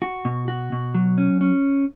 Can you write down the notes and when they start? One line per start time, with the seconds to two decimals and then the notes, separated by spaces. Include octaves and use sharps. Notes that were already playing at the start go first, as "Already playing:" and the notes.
0.02 F#4
0.25 B2
0.48 F#4
0.72 B2
0.94 F#3
1.18 C#4
1.41 C#4